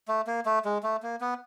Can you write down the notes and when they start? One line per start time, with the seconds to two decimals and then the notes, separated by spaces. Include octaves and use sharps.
0.08 A3
0.27 A#3
0.46 A3
0.65 G#3
0.83 A3
1.03 A#3
1.21 B3